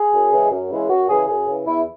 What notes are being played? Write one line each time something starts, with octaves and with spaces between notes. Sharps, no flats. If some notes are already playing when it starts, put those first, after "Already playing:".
Already playing: G#4
F#2
C#3 E3 G#3
F#2
C#3 E3 G#3
F#2 F#4
C#3 E3 G#4
F#2 G#4
C#3 E3
E2 E4